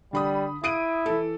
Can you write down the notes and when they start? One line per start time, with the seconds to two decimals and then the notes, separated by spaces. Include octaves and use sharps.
0.13 D3 G3 B5 D#6
0.64 E4 D#6 D7 D#7
1.06 E3 A4